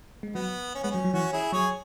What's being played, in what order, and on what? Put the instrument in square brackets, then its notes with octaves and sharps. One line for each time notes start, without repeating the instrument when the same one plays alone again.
[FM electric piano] G#3
[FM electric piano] F#3 [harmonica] B3
[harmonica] C#4
[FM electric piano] G#3 [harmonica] B3
[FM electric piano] F#3 [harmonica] C#4
[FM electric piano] F#3
[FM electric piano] E3 [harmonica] C#4 F#4
[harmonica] E4 G#4
[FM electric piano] F#3 [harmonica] G#4 C#5